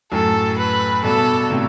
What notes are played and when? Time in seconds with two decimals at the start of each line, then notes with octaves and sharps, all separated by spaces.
0.12 F#2 A2 A4
0.58 B4
1.04 G2 B2 A4
1.50 A2 C3